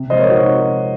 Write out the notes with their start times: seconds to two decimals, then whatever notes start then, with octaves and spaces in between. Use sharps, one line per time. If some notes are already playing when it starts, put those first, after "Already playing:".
Already playing: C3
0.10 F3 G#3 C5 D#5
0.19 A#4 C#5
0.29 C3 D#4 F#4